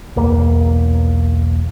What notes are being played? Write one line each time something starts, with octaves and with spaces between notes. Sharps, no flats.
B1 E2 A#3